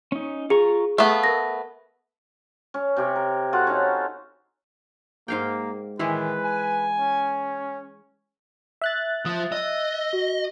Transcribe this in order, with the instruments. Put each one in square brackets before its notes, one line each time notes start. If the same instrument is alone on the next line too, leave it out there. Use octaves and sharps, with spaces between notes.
[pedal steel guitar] C#4 D#4
[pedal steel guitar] F4 A#5 C#6 [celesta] G#4
[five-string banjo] A3 B3 [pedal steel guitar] F5 D#6 E6
[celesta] A#4 A#6
[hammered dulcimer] C#4
C3 G4 C#5
A#4
F4 F#4 A4 F#5
C#4 D#4
[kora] G#2 F5 G5 [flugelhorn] A#3
[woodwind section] A2 D#3 [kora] E3 G#3 E4 [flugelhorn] B4
[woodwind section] G#5
[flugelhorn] C#4
[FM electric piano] E5 F#6 A6
[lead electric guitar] F3 F4 [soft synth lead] D#6
[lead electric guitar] D#5 [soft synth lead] E6
[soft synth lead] F#4